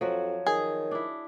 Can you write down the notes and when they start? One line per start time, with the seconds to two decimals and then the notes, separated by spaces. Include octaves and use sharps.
0.01 F2 F3 F#3 F#4 C#5
0.46 D#3 G#4
0.91 D4 E4